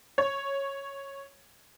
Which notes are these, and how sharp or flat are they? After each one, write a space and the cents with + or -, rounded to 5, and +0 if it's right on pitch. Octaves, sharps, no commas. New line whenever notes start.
C#5 -5